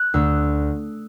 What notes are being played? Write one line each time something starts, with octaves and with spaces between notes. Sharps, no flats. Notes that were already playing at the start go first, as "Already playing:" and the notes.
Already playing: F#6
D2 D3 E6